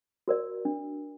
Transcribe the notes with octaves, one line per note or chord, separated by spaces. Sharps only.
F#4 A#4 D5
D4